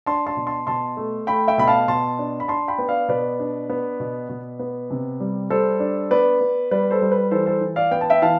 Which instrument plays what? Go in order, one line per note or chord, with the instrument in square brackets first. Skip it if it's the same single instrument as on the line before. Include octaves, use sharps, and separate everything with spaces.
[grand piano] D4 A5 C6
A5 C6
B2
A5 C6
B2 A5 C6
A3
A3 G5 B5
E5 G5
B2 B5
F5 A5
B2 A5 C6
D4
B5
D4 A5 C6
G5 B5
B3
D5 F5
B2 B4 D5
D4
B3
B2
B2
B3
C3
G3
G3 A4 C5
D4
B3 B4 D5
B3
G3 B4 D5
A4 C5
G3
B4
E3 A4 C5
A4 C5
E3
D5 F5
B3 G5
A5
E5 G5
E3 F5 A5